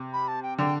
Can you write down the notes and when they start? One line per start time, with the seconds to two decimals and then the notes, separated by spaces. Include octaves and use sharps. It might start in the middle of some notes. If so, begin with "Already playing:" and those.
Already playing: C3
0.13 B5
0.28 A5
0.43 G5
0.58 D3 G5